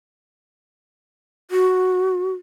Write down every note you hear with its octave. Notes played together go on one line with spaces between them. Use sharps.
F#4